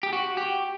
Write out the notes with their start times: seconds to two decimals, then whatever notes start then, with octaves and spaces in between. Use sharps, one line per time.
0.03 G4
0.13 F#4
0.37 G4